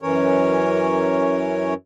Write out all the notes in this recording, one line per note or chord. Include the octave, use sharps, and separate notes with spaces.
F#2 E3 C#4 A#4 C#5